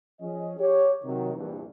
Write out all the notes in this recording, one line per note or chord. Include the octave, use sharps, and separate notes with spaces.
F3 C#4 G#4 D#5
G4 C#5
C3 D#3 F#3
A#1 E2 G2 E3